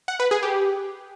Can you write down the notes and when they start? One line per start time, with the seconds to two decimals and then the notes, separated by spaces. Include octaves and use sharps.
0.08 F#5
0.20 B4
0.31 G#4
0.43 G4